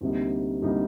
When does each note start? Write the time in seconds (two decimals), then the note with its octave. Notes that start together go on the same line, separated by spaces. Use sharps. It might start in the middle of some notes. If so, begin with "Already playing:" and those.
0.01 D2 C3 G3 A#3 D#4
0.62 D2 C3 G3 A#3 D#4